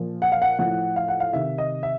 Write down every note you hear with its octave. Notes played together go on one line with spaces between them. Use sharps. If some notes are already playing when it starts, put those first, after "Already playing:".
Already playing: A#2 F3
F#5
F5
F#5
A2 F3 F#5
F5
F#5
F5
C3 D#3 E5
D#5
E5